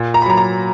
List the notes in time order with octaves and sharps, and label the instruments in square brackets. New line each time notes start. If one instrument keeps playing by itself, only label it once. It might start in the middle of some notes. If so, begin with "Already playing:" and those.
Already playing: [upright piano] A#2
A#5
B5
F#3 A#5
A#5